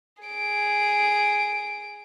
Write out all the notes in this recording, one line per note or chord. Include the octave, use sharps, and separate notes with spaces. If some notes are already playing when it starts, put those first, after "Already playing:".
G#4 D7